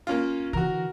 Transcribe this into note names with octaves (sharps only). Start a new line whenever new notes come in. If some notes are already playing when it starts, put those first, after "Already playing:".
A#3 C#4 F4
D3 E3 F#4 A#4